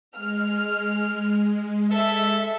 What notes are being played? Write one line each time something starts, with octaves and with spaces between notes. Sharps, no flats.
G#3 F6
A4 E5